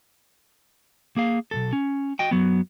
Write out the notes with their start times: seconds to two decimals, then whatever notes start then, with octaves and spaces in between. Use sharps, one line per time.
1.16 A#3 G#4 F5
1.51 B1 F#2 A4
1.73 C#4
2.19 F#4 D#5 G5
2.31 F#2 F#3 B3